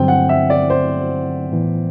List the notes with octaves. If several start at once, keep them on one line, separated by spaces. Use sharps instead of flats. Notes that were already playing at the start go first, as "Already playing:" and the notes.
Already playing: G2 D3 F#3 C4 G5
F#5
E5
D5
C5
A2 E3 B3